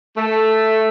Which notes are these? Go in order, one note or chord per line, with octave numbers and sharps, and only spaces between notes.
A3